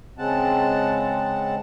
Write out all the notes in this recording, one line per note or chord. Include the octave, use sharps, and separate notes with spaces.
C#3 G#3 C4 F#5 A5